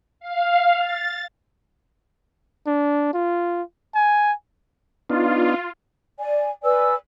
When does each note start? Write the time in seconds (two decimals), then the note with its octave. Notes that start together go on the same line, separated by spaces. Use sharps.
0.20 F5
0.79 A6
2.67 D4
3.13 F4
3.95 G#5
5.10 B3 D4 D#4 F4
6.18 D5 G#5
6.64 B4 D5 G#5 E6